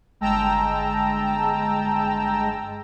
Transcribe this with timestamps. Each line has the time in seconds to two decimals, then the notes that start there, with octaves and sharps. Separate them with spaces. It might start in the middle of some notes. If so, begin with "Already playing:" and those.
0.21 G1 G#3 G5 A5 A#5 E6